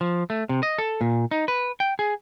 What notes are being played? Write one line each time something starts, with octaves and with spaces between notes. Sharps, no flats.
F3
A3
C3
D#5
A4
A#2
D#4
B4
G5
G#4